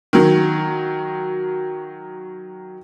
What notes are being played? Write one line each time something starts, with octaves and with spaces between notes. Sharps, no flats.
D#3 F#3